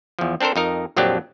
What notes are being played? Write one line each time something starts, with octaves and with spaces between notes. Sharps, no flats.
E2 F3
C4 D4 A4 A#4 C5
F2 D#4 A#4
A#1 F2 F#3 C4 D4 G4